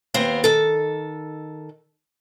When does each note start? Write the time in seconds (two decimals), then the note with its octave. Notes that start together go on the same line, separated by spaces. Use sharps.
0.14 D#2 B3 C4 F5
0.44 D#3 A4